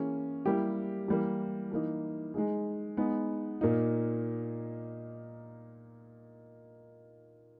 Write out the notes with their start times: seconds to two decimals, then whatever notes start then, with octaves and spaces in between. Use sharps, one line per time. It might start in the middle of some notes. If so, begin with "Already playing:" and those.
Already playing: E3 A#3 C#4 G#4
0.46 G3 A#3 E4 G4
1.08 E3 G3 A#3
1.71 E3 A#3 D#4
2.34 G#3 D#4 G#4
2.97 G#3 B3 D#4
3.61 A#2 A#3 D#4